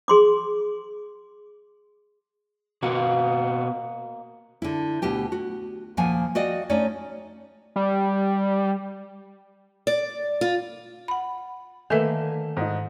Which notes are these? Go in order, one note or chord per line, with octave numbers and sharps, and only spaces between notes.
G#4 C6 D6
B2 A#3 C4 F#4 D#5 C6
D3 E4
D2 B2 G4 G5
F#4
D#2 A#2 F3 A#3 F#5 G#5
F#4 D5 D#5 F5 G5
A3 C#4 D#4 C#5 D5
G3
D5
F4
F#5 B5
D3 D#3 A3 A#3 B4 G#5 E7
G#2 D#4